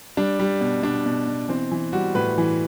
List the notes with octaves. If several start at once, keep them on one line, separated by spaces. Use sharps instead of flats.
G3 D4
G3
B2
B2 D4
B2
B2
E3 C4
E3
G3 F#4
A2 B4
E3